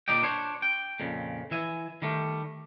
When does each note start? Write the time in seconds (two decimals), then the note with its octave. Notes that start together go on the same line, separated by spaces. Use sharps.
0.08 A#2 D#4 D5 D#5 G5
0.23 D4 C5 C#5
0.62 G5
1.00 F2 A#2 C#3
1.51 E3 E5 G#5
2.02 D#3 G3 A3